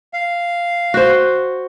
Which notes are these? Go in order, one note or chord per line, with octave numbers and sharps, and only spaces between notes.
F5
F#4 C5